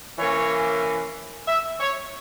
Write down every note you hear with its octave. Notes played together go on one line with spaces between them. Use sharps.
E3 A#3 C#4 C#5
E5
C#5